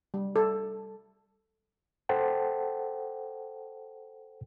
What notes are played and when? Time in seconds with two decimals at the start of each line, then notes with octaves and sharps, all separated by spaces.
0.14 G3
0.36 A4
2.09 A4 C5 F#5 G5 A5